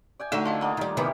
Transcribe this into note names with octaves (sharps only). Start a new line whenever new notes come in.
D5 G5 G#5
D3 F#3 A3 D#4 E5 D6
F4 D#5 F5 A5
A#3 F4 D#5 F#5 A5
D#3 G3 D#4
C3 D#3 E3 G3 B3 G4